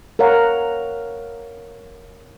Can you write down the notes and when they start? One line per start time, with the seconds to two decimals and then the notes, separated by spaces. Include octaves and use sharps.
0.19 A#4 C#5 F5 F#5